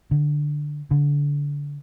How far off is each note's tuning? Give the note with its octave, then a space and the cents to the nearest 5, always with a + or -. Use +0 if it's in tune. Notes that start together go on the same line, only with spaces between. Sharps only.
D3 +10
D3 -25